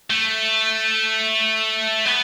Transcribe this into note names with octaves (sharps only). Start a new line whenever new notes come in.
A3
B3